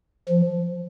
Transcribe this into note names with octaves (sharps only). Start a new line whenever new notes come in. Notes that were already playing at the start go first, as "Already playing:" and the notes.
F3